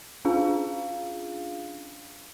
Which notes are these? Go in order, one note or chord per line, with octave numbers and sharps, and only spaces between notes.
C#4 D4 F4 G#4 F5